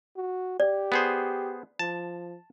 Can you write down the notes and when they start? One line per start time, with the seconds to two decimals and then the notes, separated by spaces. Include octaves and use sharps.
0.16 F#4
0.60 G4 D5
0.92 B3 G#4 C5
1.79 F3 A5